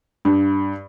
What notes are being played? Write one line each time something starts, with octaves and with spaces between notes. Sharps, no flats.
G2